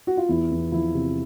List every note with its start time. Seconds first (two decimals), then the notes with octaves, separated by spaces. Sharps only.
0.07 F#4
0.17 F4
0.29 E2 E4
0.51 E2
0.72 F3 E4
0.94 C3